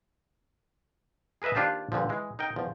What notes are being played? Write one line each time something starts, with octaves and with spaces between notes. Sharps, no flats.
G#4 A#4 B4 D#5 E5
D#2 D4 F4 G4 C5 A5
G2 A#2 D3 F3
E3 G#3
D#4 A#4 G5
E2 F3